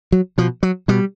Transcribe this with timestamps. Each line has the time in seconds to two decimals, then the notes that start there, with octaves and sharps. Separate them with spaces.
0.12 F#3
0.38 B2 F3
0.63 F#3
0.88 B2 G3